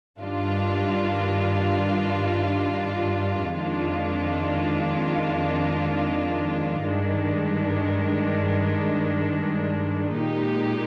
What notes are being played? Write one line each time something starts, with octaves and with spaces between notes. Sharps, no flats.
G2 D#3 G3 D4 F4
F2 D#3 G#3 D4 F4
G2 D#3 G#3 D4
A#2 G#3 D#4 G4